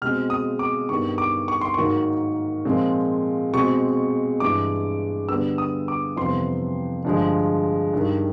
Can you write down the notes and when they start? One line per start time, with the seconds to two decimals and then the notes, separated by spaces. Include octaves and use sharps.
0.02 B2 G#3 C4 F6
0.30 D#6
0.59 D6
0.89 G2 D#3 G3 B3 C#6
1.18 D6
1.48 C#6
1.61 C6
1.74 G#2 D#3 F#3 A#3 C#6
2.65 A#2 F3 G#3 C4
3.53 B2 G#3 C4 C#6
4.40 G2 E3 G#3 D6
5.29 D3 G3 B3 D4 E6
5.58 D#6
5.88 D6
6.16 F2 C3 E3 G3 B3 C6
7.05 G2 D3 F3 G#3
7.93 G2 D#3 G3